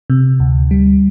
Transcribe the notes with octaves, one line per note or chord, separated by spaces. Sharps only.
C3
D2
G3